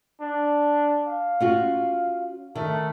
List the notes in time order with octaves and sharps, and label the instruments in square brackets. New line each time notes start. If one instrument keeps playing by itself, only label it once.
[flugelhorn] D4
F5
[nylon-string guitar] C#4 F4 F#4
[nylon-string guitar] D#3 [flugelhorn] A3